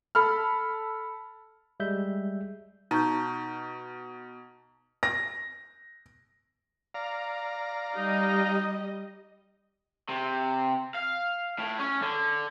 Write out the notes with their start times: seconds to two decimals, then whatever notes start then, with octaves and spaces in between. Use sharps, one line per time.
0.15 A4 B5 F6
1.80 G3 G#3 E5 G6
2.91 B2 D#4 A#5 C#6 G6
5.03 A#6
6.94 D5 F5 A#5
7.96 G3 D#4 D#5
10.09 C3
10.94 F5
11.58 A2
11.80 C#4
12.02 D3